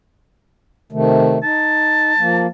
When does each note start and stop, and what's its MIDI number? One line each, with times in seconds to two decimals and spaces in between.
0.92 1.38 48
0.92 1.38 51
0.92 1.38 57
1.43 2.13 63
1.43 2.48 81
2.19 2.47 53
2.19 2.47 58